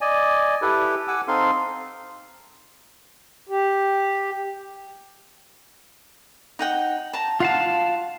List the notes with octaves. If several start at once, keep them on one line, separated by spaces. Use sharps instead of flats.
D5 D#5 G#5
E4 G4 A4 B4
F#5 G#5 D6 E6
C4 D#4 A4 F5 C6
G4
D#4 F#5 G5
A5 A#5
F4 F5 F#5 A5